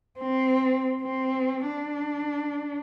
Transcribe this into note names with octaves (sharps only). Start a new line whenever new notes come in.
C4
C4
D4